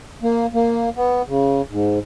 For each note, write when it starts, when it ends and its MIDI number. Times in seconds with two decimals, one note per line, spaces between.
0.23 0.46 58
0.54 0.89 58
0.97 1.22 59
1.28 1.62 49
1.71 1.99 44